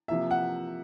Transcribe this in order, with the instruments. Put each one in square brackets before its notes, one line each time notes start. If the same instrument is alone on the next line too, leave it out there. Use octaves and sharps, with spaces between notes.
[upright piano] C3 F3 A#3 E5
F#5